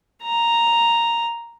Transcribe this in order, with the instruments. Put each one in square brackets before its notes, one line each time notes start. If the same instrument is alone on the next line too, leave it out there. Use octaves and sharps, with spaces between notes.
[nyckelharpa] A#5